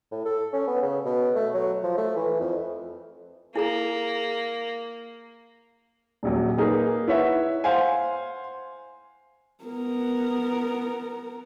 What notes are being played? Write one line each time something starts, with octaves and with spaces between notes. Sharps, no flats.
A2
A4
C#4
B3
C#3
B2
A3
F#3
F3
A3
E3
F2
A#3 E4 G#4 A#5
D#1 A#1 F#3
A#3 D#4 G#4 A#4 B4
E4 B4 C#5 E5 F#5
C5 F5 F#5 G#5
B3 A#4